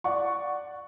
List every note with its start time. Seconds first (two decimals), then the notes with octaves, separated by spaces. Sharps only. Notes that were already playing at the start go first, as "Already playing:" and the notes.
0.04 D5 F#5 C#6